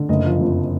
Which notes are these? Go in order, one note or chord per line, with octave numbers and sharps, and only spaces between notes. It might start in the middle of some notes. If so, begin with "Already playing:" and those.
Already playing: D3
F#1 D#5
F3
F2